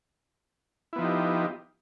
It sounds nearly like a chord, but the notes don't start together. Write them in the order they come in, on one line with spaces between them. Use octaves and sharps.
E4 B3 F3 D#4 G4